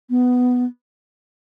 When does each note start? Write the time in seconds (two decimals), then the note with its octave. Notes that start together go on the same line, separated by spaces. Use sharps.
0.10 B3